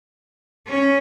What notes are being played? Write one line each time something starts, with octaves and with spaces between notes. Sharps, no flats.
C#4